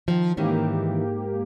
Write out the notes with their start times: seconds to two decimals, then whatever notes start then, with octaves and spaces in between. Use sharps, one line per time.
0.08 D#3 F3
0.37 G#2 D#3 E3 A#3 C#4 G4